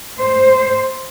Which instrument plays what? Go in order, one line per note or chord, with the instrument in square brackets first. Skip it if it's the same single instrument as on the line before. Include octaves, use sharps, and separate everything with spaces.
[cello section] C5